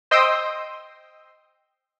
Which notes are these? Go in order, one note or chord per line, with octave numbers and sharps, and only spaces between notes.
C5 D#5 G5 C6 D#6 E6